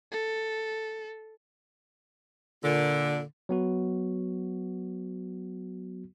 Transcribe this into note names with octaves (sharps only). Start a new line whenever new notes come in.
A4
A#2 D3
F#3 B3 F#4